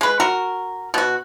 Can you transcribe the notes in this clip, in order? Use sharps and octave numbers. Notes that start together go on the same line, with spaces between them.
G#3 B4
F#4 A#4
B2 F#4